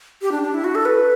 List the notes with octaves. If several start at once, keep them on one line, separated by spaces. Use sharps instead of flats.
G4
D4
D4
E4
F#4
A4
B4